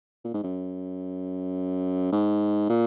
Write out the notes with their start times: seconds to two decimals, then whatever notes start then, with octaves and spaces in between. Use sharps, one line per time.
0.25 A#2
0.34 G#2
0.44 F#2
2.12 G#2
2.69 A#2